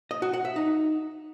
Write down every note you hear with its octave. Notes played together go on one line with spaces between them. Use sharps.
D#5
F#4
F#5
E5
D#4